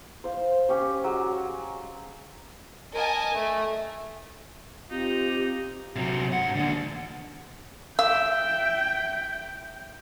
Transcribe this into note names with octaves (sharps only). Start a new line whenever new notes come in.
C5 F5
C#4 G4 C#5
F#3 G#3
A#4 D#5 G#5 A5
A3
C4 D#4 F4 G4
C3 F#3
G2 F#5
D#2 D3
E5 F5 G5 E6